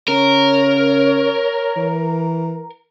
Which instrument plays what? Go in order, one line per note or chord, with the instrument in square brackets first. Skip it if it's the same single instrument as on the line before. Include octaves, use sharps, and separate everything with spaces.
[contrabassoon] C#3 [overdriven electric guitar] A#4 [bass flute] C#5
[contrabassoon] E3